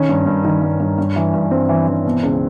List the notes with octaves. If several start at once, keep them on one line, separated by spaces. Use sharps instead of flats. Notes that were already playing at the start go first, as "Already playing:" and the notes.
Already playing: D#3 C#4
G2
G2
D#3
G2
G2
G2
E3
G2
G2 C4
E3
E3
B2
C#2